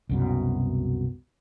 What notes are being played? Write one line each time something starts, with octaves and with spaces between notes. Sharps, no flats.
C2 F#2 B2